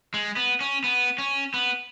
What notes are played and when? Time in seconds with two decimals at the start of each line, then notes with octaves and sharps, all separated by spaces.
0.14 G#3
0.36 B3
0.61 C#4
0.84 B3
1.18 C#4
1.54 B3